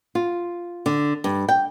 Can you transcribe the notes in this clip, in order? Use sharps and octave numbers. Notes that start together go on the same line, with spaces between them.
F4
D3
G2
G5